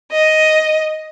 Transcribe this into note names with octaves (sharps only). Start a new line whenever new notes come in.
D#5